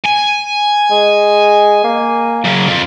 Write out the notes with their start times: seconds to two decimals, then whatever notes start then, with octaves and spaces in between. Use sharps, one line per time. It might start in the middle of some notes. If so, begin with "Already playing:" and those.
0.04 G#5
0.91 G#3
1.84 A#3
2.45 F#2 C#3
2.68 F2